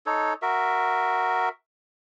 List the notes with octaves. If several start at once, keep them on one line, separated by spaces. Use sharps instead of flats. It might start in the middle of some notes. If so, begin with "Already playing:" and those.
D#4 A4 C#5
F#4 A#4 E5